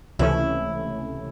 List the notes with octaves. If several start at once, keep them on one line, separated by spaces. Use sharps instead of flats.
C#2 C3 E3 A3 C#4 E4